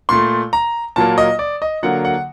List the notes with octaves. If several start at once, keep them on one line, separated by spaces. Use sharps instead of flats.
A#2 A3 C6
A#5
A#2 F#3 A#3 A5
D#5
D5
D#5
D3 F#3 A#3 F#5
F#5